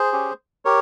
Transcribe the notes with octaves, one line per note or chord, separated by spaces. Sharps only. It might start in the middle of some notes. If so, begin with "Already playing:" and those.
Already playing: G#4 C5
C#4 G4
G4 A#4 C#5